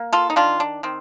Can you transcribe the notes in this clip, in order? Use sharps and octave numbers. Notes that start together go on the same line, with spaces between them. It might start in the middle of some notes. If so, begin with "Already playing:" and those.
Already playing: A#3
F4 A4
D#4
D#3 D4 F4
D4
D#3 C4